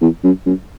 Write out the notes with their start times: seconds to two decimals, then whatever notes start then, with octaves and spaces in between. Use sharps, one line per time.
0.01 E2
0.24 F#2
0.46 F#2